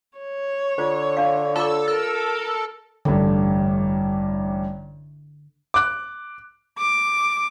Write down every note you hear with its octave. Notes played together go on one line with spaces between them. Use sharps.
C#5
D3 F4 C5
D4 F5
F4 A4 D6
A4 A#4
A1 G2 D3
D6 F#6
D6